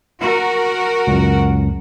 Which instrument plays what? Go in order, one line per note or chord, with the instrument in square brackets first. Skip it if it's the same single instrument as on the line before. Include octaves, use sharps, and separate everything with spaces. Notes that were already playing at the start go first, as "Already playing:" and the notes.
[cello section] F#4 A#4
[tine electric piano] C#2 F#2